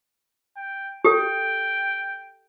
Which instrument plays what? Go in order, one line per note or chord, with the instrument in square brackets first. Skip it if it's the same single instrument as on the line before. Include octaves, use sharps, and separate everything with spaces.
[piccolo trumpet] G5
[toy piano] G4 A4 [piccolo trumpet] G5